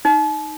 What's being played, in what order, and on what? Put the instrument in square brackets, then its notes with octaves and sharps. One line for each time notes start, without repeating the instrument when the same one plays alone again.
[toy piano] D#4